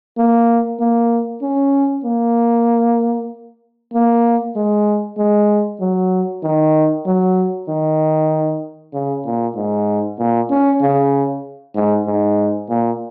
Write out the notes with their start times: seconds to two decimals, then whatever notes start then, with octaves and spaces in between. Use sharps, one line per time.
0.17 A#3
0.80 A#3
1.42 C#4
2.04 A#3
3.93 A#3
4.56 G#3
5.17 G#3
5.80 F#3
6.43 D#3
7.06 F#3
7.69 D#3
8.93 C#3
9.25 A#2
9.56 G#2
10.19 A#2
10.50 C#4
10.81 C#3
11.75 G#2
12.06 G#2
12.69 A#2